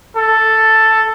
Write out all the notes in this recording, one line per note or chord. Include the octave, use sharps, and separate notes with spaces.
A4